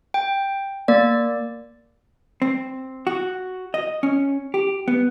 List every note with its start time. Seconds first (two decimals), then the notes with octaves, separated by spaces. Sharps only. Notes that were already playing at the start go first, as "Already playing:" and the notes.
0.14 G5
0.88 A#3 D5
2.42 C4
3.07 F#4
3.74 D#5
4.03 C#4
4.54 G4
4.88 B3